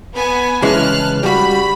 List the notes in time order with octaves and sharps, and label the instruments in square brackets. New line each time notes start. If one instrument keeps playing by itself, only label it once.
[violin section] B3 B4 G#5
[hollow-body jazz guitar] C#3 E3 G#3 [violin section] A5 F6 F#6
[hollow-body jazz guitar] G3 F#4 [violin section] B5